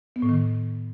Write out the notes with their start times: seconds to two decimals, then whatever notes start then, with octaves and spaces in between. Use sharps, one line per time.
0.16 B3
0.22 A2
0.29 D#3